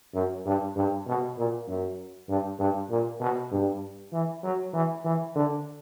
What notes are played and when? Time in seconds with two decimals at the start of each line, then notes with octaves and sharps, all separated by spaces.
0.14 F#2
0.46 G2
0.76 G2
1.07 B2
1.38 A#2
1.68 F#2
2.29 G2
2.60 G2
2.90 A#2
3.20 B2
3.52 G2
4.13 E3
4.44 F#3
4.74 E3
5.05 E3
5.35 D3